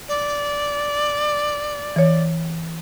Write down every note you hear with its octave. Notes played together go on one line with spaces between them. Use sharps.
D5
E3 C#5